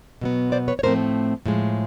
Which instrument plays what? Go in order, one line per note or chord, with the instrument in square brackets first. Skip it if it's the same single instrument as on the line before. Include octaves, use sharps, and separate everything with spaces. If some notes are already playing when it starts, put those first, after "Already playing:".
[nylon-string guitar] B2 F#3 B3
C5 D5
B4 C#5
C#5
A2 F3 A3 C4 A#4 C5
A2 F3 G#3